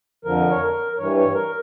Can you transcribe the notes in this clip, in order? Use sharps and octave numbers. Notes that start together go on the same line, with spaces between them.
F2 D3 F3 A#4
C#5
A#4
A#4
G2 E3 G3 C#5
C#5
A#4